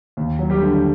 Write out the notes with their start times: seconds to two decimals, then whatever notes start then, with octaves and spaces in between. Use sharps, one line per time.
0.17 D#2
0.39 F#3
0.50 G3 G4
0.61 D3